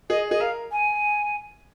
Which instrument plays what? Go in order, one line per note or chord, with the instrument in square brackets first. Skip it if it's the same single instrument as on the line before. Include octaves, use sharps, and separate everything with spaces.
[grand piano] G#4 [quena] D#5
[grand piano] G#4 [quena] D#5
[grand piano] A#4 [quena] F5
[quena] G#5